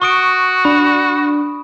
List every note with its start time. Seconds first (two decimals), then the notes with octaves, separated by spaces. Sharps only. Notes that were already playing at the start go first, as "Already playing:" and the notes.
0.02 F#4 C#6 D#6 D7
0.65 D4 B5